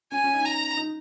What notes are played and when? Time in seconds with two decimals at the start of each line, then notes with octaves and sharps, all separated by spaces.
0.12 C#4 G#5
0.24 C#4
0.34 D#4
0.45 A#5
0.77 D#4